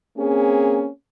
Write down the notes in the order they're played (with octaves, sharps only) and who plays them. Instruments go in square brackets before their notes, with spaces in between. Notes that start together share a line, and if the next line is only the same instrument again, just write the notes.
[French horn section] A#3 C4 C#4 G#4